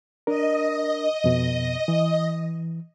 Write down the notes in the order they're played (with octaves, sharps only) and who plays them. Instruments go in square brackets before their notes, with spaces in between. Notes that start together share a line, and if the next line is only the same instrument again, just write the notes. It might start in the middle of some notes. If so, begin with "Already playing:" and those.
[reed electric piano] D4 A#4 [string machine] D#5
[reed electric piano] F2 B2
E3